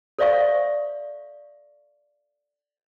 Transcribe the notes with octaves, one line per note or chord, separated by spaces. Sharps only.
A4 C5 D5 E5 F5 C#6